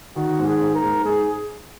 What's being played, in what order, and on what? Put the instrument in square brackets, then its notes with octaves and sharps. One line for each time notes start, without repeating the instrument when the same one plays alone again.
[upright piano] D#3 [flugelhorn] F#4
[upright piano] G#2
[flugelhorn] G#4
[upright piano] G#2
[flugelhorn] A#4
[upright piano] G#2
[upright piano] G#2 [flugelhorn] G#4